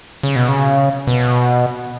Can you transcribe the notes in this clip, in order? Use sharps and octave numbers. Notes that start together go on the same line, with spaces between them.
C#3
B2
C#3
B2